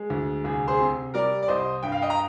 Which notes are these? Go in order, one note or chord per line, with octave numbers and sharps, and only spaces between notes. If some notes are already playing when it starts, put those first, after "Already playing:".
Already playing: G#3
D2
C2 G#4
G#4 C5
C3
G3 A#4 D5
D5
C2 C5 D#5
G2 G5
F5
D#5 G5
A#5